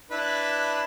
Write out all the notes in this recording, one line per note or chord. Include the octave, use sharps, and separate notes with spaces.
D4 E4 B4